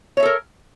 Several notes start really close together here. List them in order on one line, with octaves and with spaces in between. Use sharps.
C#5 E5 A4 A#4